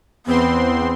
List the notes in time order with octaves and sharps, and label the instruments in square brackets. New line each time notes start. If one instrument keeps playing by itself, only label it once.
[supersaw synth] E2 C4 C6 [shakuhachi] B3